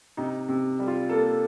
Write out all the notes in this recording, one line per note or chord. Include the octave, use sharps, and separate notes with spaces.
C3 D#4
C3
G3
F4
A#3 A4